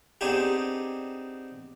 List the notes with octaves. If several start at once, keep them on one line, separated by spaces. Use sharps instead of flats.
B3 C4 D4 D#4 G4 G#4